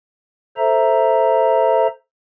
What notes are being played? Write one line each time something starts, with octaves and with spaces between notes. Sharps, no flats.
A4 C5 E5 A#5